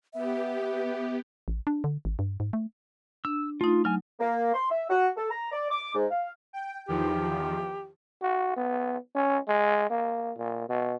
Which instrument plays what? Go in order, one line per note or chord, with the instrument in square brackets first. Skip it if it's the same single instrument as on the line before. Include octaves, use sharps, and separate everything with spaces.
[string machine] B3 G4 [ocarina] E5
[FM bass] A1
D4
D3
G#1
G2
G#2
A3
[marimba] D4 [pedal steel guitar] E6
[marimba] A3 D#4 [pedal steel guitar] F4
[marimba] F#3 [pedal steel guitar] G#5 F6
[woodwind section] A#3
C6
E5
F#4
A4
A#5
D5
D6
G#2
F5
[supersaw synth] G5
[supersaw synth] E2 D#3 F3 [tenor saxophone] G4
[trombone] F#4
B3
C#4
G#3
A#3
A#2
B2